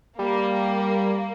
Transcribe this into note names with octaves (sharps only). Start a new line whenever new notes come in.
G3 A#3